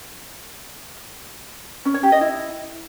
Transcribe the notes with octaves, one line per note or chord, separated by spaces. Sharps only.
C#4
C#5
G4
D#5
E4